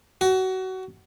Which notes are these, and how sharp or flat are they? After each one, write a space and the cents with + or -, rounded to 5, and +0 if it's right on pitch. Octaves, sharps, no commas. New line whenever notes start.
F#4 +25